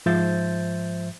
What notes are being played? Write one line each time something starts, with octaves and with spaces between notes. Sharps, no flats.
G#2 F3 C5 E5 G6 A6